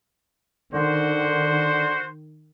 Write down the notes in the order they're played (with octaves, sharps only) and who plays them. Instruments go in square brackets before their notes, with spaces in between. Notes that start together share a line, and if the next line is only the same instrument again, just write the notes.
[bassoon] D3 [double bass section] D#3 [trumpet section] F#4 C5